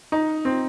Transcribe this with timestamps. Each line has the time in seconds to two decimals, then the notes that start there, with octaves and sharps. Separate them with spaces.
0.12 D#4
0.45 C4